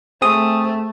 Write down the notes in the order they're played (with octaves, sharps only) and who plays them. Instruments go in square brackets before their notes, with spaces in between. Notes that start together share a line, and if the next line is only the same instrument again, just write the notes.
[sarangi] A3 [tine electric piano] C4 G#4 D#6